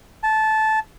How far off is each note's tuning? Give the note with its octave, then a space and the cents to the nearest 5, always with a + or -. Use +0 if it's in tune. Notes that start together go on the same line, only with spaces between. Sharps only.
A5 -15